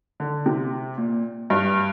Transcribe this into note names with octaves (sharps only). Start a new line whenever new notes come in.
D3
C3
A#2
G2